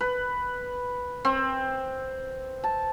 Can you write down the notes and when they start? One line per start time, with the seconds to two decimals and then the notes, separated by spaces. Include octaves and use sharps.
0.01 B4
1.25 C4
2.64 A5